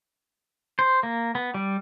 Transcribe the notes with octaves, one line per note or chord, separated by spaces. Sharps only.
C5
A#3
B3
G3